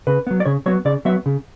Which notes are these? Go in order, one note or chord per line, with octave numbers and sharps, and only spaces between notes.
C#3 B4
F#3 B3
D5
C#3 C#5
F#3 B3 C#5
C#3 D5
F#3 B3 E5
C#3